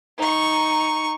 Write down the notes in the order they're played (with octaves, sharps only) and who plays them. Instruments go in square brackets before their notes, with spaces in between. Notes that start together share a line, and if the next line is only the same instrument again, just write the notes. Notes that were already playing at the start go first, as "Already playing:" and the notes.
[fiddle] D#4 C#6